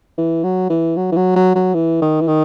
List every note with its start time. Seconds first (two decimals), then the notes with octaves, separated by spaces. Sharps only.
0.18 E3
0.44 F#3
0.70 E3
0.97 F#3
1.12 E3
1.16 F#3
1.36 F#3
1.55 F#3
1.74 E3
2.02 D#3
2.21 E3
2.28 D#3